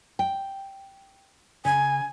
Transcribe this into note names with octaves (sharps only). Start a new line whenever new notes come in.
G5
C#3 G#5